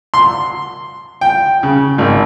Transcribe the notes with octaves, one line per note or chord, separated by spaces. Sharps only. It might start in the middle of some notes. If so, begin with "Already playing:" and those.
C6
G5
C#3
G#1